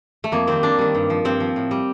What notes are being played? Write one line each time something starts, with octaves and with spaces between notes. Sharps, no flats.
A3
F2 A#3
D#3 G3 C4
F2 D4
D#3 G3
G2
F3
G2 C4
F3
A2
G3